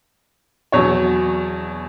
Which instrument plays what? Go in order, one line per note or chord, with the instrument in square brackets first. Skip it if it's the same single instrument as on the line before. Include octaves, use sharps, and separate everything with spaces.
[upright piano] E2 B2 F#3 C#5